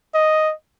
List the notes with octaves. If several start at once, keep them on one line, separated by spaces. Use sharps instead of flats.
D#5